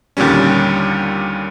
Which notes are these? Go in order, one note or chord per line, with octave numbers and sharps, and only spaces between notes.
D#2 A#2 D3 G3 C#4